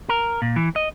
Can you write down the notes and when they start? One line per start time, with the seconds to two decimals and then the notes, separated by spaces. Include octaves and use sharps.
0.09 A#4
0.42 A#2
0.56 E3
0.76 D#5